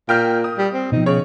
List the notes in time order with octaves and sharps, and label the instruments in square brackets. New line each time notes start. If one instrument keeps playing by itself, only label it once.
[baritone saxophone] A#2 [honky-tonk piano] G5 F6 G6
[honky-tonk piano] D#6
[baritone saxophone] G3
C4
[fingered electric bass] B2 F3 [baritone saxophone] D#4
[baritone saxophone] C#3 [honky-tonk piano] C#5